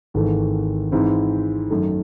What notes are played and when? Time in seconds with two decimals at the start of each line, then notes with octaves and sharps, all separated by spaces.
0.14 G#1 G#2 E3 A3
0.92 G#2 E3 C4 E4
1.70 F#2 D#3 A3